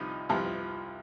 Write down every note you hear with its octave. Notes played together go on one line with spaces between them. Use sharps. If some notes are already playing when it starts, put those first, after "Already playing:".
Already playing: C2 C3 F3 D#4
C2 C3 F3